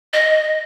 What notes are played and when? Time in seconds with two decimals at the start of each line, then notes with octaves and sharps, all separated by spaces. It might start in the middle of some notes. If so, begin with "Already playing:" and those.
0.14 D#5